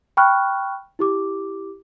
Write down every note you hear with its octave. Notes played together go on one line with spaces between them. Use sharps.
G5 B5 C#6 F6 F#6
E4 G4 D6